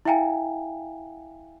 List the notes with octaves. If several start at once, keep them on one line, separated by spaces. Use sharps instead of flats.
E4 E5 F5 G5 G#5 A#5